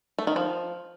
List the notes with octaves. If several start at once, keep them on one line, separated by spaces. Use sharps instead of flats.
A3
D#3
F3